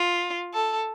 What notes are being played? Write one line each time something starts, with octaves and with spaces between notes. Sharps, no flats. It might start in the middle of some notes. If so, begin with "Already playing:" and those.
Already playing: F4
A4